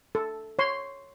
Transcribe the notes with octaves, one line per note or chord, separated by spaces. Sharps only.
A4
C#5 C6